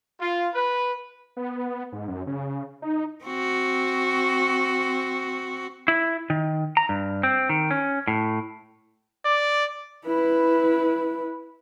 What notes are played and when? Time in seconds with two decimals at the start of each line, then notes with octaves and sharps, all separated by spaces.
0.21 F4
0.55 B4
1.37 B3
1.92 G#2
2.08 F#2
2.27 C#3
2.82 D#4
3.24 C4 F#4
5.88 E4
6.30 D#3
6.77 A#5
6.89 G2
7.23 C4
7.49 D#3
7.71 C#4
8.07 A2
9.25 D5
10.06 E4 B4